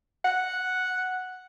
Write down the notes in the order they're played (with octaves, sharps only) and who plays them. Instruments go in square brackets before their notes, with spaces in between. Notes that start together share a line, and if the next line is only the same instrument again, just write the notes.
[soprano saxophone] F#5